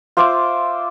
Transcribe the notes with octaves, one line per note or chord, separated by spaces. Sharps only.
F4 C5 E5 D6